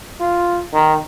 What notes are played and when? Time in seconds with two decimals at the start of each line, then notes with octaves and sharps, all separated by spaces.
0.20 F4
0.73 D#3